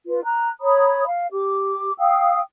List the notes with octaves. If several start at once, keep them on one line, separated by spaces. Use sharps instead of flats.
F4 B4
A#5 F#6
C#5 A#5 B5 D#6
F5
G4 D6
F5 G5 D#6 E6